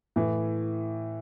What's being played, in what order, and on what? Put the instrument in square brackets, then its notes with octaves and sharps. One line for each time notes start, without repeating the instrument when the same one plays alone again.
[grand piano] A2 E3